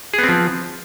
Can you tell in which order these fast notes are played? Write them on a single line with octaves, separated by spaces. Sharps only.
G#4 B3 C4 F3